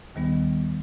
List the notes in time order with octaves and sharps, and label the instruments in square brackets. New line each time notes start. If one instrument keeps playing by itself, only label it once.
[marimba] D#2 D#3 G3 B3